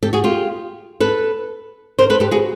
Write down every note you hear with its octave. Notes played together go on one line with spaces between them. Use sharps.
G4 A4
F#4 G#4
F4 G4
A4 B4
A#4 C5
A4 B4
G4 A4
F#4 G#4